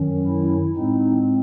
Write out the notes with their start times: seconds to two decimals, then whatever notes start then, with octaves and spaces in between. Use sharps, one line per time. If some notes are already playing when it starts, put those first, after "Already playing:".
Already playing: F#2 D#3 F#3 C#4
0.27 E4
0.76 A2 G#3 C4 D#4